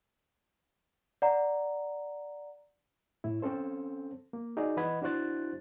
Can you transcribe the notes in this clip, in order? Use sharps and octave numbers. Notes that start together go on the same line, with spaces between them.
D5 F#5 A#5
A2 E4
C4 C#4 A4 C5
A#3
D#4 F#4 G#4 D5
E3 B4 D#5 F#5 B5 G#6
D4 E4 F#4 C5 F#6 A6